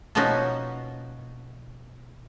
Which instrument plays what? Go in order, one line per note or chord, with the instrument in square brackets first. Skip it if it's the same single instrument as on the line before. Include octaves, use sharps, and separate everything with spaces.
[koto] B2 F3 A#3 C#4 D#4 F#4